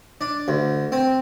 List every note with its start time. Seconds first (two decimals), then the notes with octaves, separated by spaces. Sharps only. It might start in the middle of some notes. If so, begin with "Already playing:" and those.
0.21 D4
0.48 D2
0.92 C4